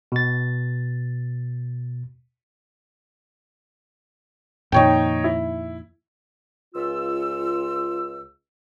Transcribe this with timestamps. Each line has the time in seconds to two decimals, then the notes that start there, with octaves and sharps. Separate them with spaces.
0.12 B2 A6
4.72 F2 A#2 D#3 D#4 C#5 G5
5.24 E4
6.75 C#2 F4 E6